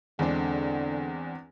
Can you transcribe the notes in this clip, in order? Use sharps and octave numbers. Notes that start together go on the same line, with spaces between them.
E2 D3 G#3 C4 D4